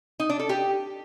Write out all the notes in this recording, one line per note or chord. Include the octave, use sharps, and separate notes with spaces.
D#4
D4
A4
G4